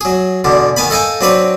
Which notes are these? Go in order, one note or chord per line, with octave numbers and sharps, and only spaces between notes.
F#3 G#4
E2 B2 D3
D#3 B3 G#5 A5 B5
A4 D#5 F5 G5 G#5
F#3 C4 D4 B4 C#5